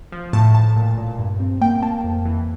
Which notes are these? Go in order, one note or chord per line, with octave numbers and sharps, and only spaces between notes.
F3
A2 A5
A2 A5
A#2
A#2
G2
C4
A#3 G5
A#3 A5
F2
E3